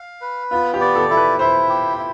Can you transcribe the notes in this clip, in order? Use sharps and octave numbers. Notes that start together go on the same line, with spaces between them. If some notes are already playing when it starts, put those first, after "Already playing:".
Already playing: F5
B4
B3 F4
G4
D5
A4
E4 A4
B4
E4 C5
G4
E4